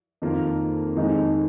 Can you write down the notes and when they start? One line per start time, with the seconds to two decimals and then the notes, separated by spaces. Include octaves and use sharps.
0.22 F2 D#3 A#3 F4
0.96 F2 D#3 G#3 D#4